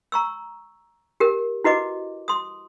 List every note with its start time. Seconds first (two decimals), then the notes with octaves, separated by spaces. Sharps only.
0.12 A#5 C#6 E6
1.20 G4 A#4
1.64 E4 F#4 B4 D#5 D6
2.28 C6 D#6